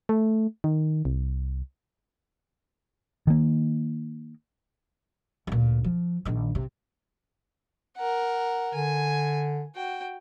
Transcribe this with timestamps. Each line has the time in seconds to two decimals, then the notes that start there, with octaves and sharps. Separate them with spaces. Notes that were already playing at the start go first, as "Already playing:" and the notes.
0.09 A3
0.64 D#3
1.05 C2
3.27 D#3 A#3
5.47 D2 A#2
5.84 F3
6.25 A#1 D#3
6.55 C3
7.97 A#4 F#5
8.74 D3 G#5
9.75 F#4 G5